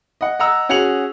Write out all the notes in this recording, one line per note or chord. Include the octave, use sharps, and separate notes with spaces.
D#5 F#5
D#5 F#5 A#5 E6
C#4 F#4 G#4 C#7 F7 F#7